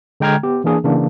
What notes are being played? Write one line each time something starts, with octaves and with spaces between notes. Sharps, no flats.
D3 G#3 G5 A#5 F6 G#6
B3 G4
E3 A#3 D4 G#4
C#3 E3 A#3 D4